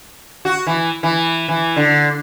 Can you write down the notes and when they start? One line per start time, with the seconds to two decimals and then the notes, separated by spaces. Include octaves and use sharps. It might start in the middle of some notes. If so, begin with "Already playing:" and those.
0.45 F#4
0.67 E3
1.03 E3
1.48 E3
1.76 D3